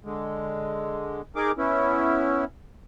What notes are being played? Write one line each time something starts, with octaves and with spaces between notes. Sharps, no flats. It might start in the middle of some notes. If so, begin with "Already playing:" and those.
D3 G#3
D#4 G#4 A#4 D6
B3 C#4 E4